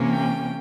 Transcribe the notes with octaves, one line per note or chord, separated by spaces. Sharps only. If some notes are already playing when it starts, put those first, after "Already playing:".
Already playing: C3 E3 A#3 C#4
G5